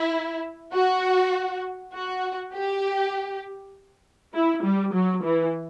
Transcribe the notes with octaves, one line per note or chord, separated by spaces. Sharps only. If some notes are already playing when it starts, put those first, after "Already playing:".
Already playing: E4
F#4
F#4
G4
E4
G3
F#3
E3